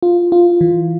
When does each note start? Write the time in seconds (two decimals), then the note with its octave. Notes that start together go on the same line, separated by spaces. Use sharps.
0.03 F4
0.32 F4
0.61 E3